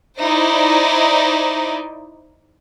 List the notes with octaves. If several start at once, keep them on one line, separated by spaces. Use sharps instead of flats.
D#4 E4 C5 D5